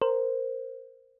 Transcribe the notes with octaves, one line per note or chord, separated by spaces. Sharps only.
A#4 C5